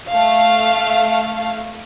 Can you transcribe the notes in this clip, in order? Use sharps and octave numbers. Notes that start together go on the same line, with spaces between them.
A3 F5